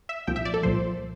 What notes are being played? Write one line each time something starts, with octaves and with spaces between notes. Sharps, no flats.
E5
C2 A#2 F3 G5
E5
D5
A4
C2 A#2 F3 C5